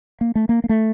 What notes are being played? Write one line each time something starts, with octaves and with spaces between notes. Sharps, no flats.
A#3
A3
A#3
A#3
A3